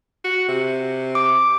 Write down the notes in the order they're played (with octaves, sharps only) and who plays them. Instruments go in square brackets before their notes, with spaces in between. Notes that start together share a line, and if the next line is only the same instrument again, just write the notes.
[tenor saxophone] F#4
C3
[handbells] D6